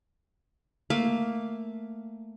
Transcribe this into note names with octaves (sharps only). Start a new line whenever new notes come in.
A3 A#3 F5